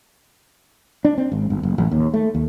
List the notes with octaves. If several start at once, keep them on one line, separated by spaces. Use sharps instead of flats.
D4
C4
G#1
G1
F#1
A1
D#2
A3
D#2